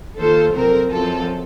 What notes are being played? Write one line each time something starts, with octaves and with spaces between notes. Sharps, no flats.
D#3 A#3 F4 A4 C5
F2 C3 F#3 C4 A#4
F#2 F3 C4 F4 A4